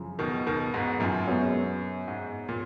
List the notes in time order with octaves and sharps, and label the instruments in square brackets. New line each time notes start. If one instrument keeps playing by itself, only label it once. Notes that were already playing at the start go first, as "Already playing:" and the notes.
Already playing: [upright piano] F#2 C#3 F3
[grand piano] B2 D#3
B2 D#3
G#2 B2
F#2 A#2
[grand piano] F#2 [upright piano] B2 G#3 B3 F#4 C#5
[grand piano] G#2
A#2